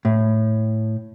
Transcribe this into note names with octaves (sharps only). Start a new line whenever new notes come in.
A2